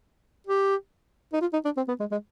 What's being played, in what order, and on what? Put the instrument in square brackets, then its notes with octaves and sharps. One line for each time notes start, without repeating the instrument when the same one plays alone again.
[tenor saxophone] G4
D#4
F4
D#4
D4
C4
B3
G#3
G#3